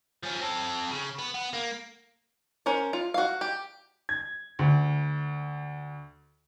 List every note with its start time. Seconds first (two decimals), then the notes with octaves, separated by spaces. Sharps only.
0.23 F3 C#4
0.41 C4 A4
0.91 C#3
1.19 B3
1.34 B3
1.53 A#3
2.66 C#4 A#4 C5
2.93 F4
3.14 F#4 F5
3.41 G4
4.09 G#6
4.59 D2